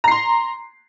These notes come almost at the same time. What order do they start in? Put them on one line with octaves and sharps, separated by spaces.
A#5 C7 C6